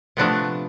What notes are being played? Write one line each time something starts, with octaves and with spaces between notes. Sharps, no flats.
C3 F3 A3 B3 D4